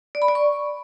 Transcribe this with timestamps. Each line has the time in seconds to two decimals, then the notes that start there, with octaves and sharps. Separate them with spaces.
0.15 D5
0.22 B5
0.28 D5
0.35 C#6